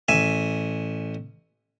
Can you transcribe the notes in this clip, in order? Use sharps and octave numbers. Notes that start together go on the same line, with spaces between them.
A1 E5 G#5